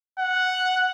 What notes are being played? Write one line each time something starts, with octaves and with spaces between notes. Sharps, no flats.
F#5